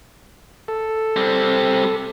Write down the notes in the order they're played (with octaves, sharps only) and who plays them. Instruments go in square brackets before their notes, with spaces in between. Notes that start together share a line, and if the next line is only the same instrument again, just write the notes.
[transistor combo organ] A4
[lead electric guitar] G3 C4